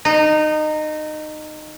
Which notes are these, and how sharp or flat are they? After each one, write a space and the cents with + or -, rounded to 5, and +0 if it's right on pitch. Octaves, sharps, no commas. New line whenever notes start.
D#4 -20